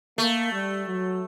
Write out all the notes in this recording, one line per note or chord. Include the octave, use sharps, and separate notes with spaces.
A3 A#3
G3
F#3